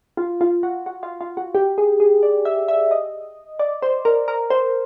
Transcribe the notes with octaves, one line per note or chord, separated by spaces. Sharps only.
F4
F4
F#4
F#4
F4
F4
F#4
G4
G#4
G#4
D5
E5
E5
D#5
D5
C5
A#4
A#4
C5